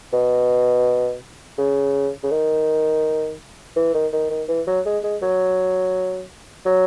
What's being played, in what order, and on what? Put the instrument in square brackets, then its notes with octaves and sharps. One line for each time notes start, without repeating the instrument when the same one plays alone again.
[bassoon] B2
C#3
C#3
D#3
E3
D#3
D#3
D#3
E3
F#3
G#3
G#3
F#3
F#3